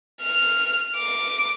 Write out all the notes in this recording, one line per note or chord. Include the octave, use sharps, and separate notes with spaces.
F6
D6